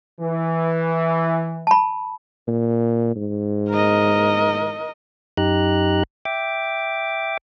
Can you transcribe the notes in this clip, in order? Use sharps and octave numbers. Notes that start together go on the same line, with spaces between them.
E3
A5 B5
A#2
G#2
A#4 D#5
F#2 D#4 G4 A#5 F#6
E5 G5 D6